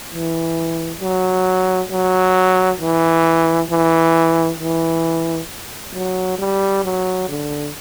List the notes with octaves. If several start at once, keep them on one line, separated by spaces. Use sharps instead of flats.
E3
F#3
F#3
E3
E3
E3
F#3
G3
F#3
D3